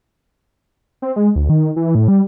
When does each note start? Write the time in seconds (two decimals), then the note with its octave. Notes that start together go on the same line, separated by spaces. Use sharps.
1.02 C4
1.16 G#3
1.36 D2
1.49 D#3
1.76 E3
1.95 A2
2.08 G3